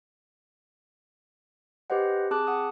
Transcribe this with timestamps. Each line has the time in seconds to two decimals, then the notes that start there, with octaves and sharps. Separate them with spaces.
1.90 G4 B4 C5 D#5 F#5
2.31 C4 G#4 A5 D6 F#6
2.47 F#5 D#6